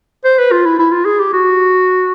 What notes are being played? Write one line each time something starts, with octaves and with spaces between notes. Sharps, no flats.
C5
B4
F4
E4
E4
F4
G#4
G4
F#4